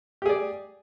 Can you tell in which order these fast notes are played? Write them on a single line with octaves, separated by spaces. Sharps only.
G4 G#4 D5